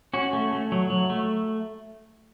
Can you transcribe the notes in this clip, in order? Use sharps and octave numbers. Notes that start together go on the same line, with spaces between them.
C#4 F#4
A3
A3
F#3
F#3
A3